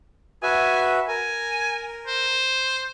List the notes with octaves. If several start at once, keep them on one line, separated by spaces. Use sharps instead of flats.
F#4 B4 E5 G#5
A#4 G#5
C5